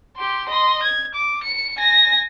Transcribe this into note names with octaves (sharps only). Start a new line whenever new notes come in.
G4 C6
D#5 C6
G#6
D6
C#7
G#5 A#6